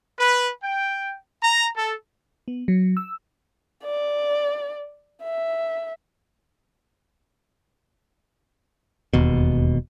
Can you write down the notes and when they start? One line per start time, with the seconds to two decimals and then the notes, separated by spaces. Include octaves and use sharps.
0.18 B4
0.63 G5
1.43 A#5
1.75 A4
2.48 B3
2.68 F#3
2.97 E6
3.84 D5
5.23 E5
9.13 E1 D#2 B2